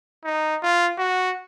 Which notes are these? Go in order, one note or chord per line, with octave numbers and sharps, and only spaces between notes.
D#4
F4
F#4